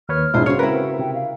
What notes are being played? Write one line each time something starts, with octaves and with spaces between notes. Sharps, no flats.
D#2 B4 C#5 F6
E1 A#1 G#2 E4 F4 C5
C#3 F#4 C5 C#5 F6
C4 E4 A#4 B4
C3 G5
F5